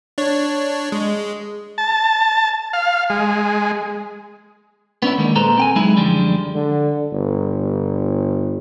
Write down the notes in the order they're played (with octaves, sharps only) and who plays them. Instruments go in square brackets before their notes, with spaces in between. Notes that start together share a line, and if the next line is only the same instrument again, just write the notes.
[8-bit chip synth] D4 C#5
G#3
[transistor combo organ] A5
F5
G#3
[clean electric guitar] B3 C#4 D4 E4
D#3 G#3 A#3
A#2 G#3 A4 B4 C5 A#5
C4 G5 G#5
F#3 G#3 D#4 E4 G#4
F#2 D3 F3 G3 G#3
[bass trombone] D3
G1